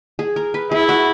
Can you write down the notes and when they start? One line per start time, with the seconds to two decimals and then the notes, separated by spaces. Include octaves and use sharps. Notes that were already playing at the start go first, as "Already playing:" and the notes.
0.19 G#4
0.36 A#4
0.54 B4
0.72 E4 G#4
0.89 F#4